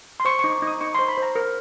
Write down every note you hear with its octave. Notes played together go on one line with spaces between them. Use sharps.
C6
C5 C#6
D#4 C#6
D6
D#4
D#6
D#4 C#6
C5 C6
B5
C5
A#5
A#4